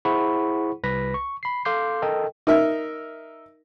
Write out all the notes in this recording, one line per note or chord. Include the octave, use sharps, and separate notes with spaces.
E4 G#4 C5 F#5 B5 C#6
C2 B4 A#6 B6
C#6
B5 C7
A4 F5 C6 D6 G6 C7
A4 A#4 D#5 G5
D#4 A#4 E5